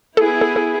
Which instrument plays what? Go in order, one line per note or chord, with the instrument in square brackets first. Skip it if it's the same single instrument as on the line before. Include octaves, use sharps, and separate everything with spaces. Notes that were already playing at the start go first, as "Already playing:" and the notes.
[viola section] B3 E4 G#4 [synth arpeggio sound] A4
[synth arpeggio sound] A4
A4